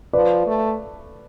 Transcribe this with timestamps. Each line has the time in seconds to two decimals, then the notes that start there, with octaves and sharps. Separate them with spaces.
0.13 F3 B4 D5
0.46 A3